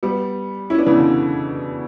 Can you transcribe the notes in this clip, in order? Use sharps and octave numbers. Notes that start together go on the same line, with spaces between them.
G3 B3
C#4 E4
B3 D4
C#3 E3
B2 D3